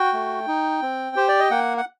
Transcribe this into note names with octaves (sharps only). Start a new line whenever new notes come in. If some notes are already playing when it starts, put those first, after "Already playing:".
Already playing: F#4 G5
A3
D#4
C4
G4 C5
D5
D#5
A#3 F#5
F#5